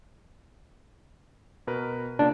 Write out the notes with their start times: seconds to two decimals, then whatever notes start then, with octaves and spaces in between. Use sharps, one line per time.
1.67 B2 A#4 B4
2.19 C#3 A#3 D4 F4